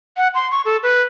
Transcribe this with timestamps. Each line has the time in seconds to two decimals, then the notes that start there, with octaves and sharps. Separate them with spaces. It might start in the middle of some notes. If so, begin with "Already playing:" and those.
0.17 F#5
0.35 C6
0.51 C#6
0.65 A4
0.83 B4